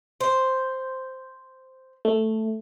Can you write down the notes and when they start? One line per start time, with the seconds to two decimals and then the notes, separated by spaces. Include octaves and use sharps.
0.21 C5
2.05 A3